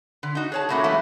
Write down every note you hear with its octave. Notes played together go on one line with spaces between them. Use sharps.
D3
D#4 F#4
G#4 C#5 A5
A2 A3 A#3 C#4 F#4
E3 F#3 G#3 A3 E4